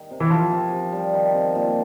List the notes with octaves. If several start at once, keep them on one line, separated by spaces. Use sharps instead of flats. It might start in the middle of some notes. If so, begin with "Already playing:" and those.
Already playing: D#3 G3
C3
E3
C3 F3
C3
C3
G3
D#3
C3
A#2